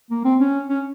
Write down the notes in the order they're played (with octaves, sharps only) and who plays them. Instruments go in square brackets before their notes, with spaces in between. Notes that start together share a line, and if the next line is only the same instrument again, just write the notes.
[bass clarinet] A#3
C4
C#4
C#4